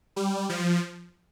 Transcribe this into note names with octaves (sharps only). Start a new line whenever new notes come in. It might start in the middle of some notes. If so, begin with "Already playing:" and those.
G3
F3